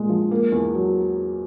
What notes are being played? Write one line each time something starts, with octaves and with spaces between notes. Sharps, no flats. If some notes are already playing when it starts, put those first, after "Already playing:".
Already playing: A#2 G#3
F3
A#3
E2
F#3